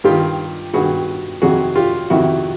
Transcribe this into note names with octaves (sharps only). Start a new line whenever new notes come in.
G2 D#3 F4 G4
G2 D#3 F#4 G#4
F2 C3 D#3 F#4 G#4
F4 G4
F2 C3 D#3 E4 F#4